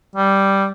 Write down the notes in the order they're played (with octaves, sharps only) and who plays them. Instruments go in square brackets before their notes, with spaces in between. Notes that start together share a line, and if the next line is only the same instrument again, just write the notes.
[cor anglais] G3